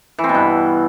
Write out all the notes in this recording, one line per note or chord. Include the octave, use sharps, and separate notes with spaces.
E3
C4
B2
G2